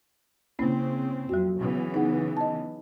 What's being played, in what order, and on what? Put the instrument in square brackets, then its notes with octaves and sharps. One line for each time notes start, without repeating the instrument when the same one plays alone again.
[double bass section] C#3 C4 [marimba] A#3 C#4 E4
[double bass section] F2 [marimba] F#3 F#4
[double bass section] C#3 E3 B3
[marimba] D#4 G#4 F#5
D#5 A5